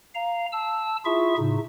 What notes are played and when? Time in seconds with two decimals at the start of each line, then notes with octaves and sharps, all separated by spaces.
0.15 F5 A#5
0.52 A5 E6
1.05 E4 F4 G#4 E5 C#6
1.38 A2 C#3 D#4